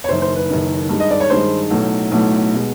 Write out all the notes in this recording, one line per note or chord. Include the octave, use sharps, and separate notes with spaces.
C#5
F#1 F#2 D#3 C5
C5
B4
F#1 F#2 D#3
G2 D#3 G#3
D#5
D5
C#5
G2 D#3 G#3 C5
B1 A2 F#3 A3
B1 A2 F#3 A3
B2 G#3